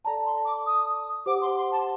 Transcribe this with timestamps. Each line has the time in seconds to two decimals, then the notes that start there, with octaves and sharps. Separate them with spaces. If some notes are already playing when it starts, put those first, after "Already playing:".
0.04 A4 D5 A5 A#5
0.25 C6
0.44 D6
0.66 D#6
1.25 G4 C5 F#5 D6
1.41 C6
1.56 C6
1.71 A5